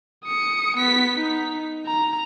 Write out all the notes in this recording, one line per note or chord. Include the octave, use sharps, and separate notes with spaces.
D#6 C#7
B3 B6
D#4
A#5